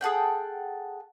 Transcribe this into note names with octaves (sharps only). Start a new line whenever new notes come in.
G#4 A4 F#5 G5